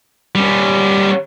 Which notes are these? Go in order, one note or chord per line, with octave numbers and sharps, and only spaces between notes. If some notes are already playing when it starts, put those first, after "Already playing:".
G3 C#4